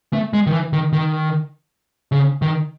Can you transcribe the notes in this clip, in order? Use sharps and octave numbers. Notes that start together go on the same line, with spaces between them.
A3
G#3
D#3
E3
D#3
D#3
C#3
D#3